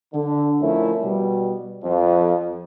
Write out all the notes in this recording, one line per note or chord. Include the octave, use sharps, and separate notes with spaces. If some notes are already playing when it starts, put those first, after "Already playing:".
D3
F2 A3 C#4 E4 A#4
B2 G3
F2